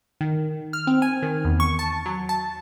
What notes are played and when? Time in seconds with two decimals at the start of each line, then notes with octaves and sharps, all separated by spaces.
0.21 D#3
0.73 F6
0.87 C4
1.02 G#5
1.23 D#3
1.45 E2
1.60 C#6
1.79 A5
2.06 F#3
2.29 A5